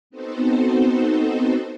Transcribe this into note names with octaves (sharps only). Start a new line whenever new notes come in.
B3 C4 D#4 F#4 A4 C5